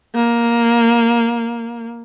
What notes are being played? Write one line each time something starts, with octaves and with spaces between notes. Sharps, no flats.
A#3